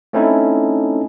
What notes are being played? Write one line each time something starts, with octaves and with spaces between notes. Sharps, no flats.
A3 C4 C#4 D#4 E4 A4